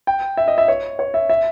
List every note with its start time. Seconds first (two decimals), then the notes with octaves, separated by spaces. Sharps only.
0.07 G5
0.37 E5
0.48 D#5
0.58 E5
0.68 C#5
0.99 C#5
1.14 E5
1.29 E5